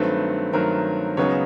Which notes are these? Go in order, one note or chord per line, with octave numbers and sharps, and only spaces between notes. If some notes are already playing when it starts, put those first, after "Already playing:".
Already playing: G2 D#3 F#3 A3 C4 B4
G2 D#3 F#3 A3 C4 A#4
C#2 C#3 F#3 B3 D#4 C#5